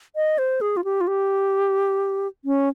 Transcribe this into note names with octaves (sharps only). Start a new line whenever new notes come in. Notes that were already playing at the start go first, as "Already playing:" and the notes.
D#5
C5
G#4
F4
G4
F4
G4
C#4